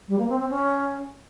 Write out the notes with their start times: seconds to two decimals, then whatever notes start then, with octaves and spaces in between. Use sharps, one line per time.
0.08 G3
0.19 A#3
0.29 C4
0.39 C4
0.49 C#4